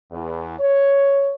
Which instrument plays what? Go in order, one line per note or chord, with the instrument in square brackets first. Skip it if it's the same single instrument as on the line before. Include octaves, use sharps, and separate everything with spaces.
[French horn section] E2
C#5